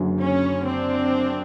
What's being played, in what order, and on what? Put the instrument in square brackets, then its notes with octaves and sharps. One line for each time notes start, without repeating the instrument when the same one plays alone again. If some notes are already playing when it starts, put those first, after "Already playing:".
Already playing: [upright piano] F#1 F#2 D3 F#3
[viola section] C#4
C4 D4